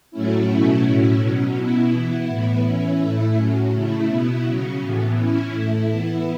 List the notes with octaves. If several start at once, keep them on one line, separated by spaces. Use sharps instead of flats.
A2 F#3 A3 C#4 E4
B2 F#3 A3 C#4 E4
A2 F#3 C#4 E4
B2 F#3 C#4
B2 B3 E4
E3 B3 E4
A2 E3 B3 E4
E3 C#4 E4
A2 A3 E4
A2 F#3 C#4
C#3 A3 E4
B2 B3 E4
C#3 F#3 C#4
A2 E3 B3
E3 C#4 E4
A2 A3 E4
E3 B3 E4